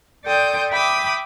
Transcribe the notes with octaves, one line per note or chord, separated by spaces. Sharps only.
A4 D5 G5 C6 D#6 G6
E5 G5 B5 D6 D#6